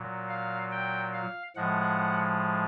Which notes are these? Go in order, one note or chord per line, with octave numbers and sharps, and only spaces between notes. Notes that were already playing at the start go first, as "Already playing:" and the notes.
Already playing: A#2 F#3
F5
G5
F5
A2 F3 G#3 F#5